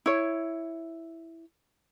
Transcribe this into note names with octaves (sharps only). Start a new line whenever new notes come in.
E4 C#5